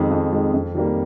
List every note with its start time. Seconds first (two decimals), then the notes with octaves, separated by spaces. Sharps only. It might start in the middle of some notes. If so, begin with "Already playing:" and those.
Already playing: F2 D#3 G#3
0.11 F2
0.33 D#3 G#3
0.54 F2
0.75 D#3 G3 A#3